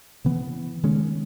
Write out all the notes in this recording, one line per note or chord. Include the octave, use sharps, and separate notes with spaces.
C#3 E3 B3
D#3 G#3 C#4